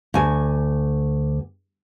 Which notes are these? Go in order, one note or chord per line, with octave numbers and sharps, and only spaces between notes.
D2 G#5